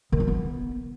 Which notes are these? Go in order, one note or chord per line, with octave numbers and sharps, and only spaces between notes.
D#3
C#4
B3